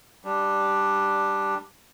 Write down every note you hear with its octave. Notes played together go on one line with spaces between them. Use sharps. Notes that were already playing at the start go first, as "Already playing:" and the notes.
G3 D4